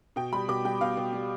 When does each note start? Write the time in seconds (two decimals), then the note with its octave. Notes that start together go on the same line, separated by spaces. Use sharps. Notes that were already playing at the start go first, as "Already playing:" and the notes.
0.16 B2 G5
0.33 G3 B5
0.48 B2 D6
0.65 G3 G5
0.81 B2 F5
0.97 B2
1.13 G3